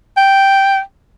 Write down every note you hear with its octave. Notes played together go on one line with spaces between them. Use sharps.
G5